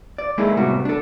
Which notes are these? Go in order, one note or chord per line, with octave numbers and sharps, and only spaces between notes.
D5
G#3 A#3 D#4 E4 G#4 A4
A2 C3 G3 B3 F#4
D4 A4